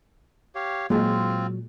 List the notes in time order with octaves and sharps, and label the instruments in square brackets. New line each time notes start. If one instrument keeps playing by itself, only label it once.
[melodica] G4 C#5 F5
[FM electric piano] A#2 [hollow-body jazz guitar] F#3 [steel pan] G#3 [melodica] C4 F4